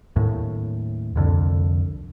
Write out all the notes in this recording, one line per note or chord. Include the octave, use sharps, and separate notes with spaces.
D#2 A2
C2 F2 D3